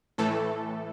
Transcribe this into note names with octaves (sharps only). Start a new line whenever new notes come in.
A2 E3 A3 A4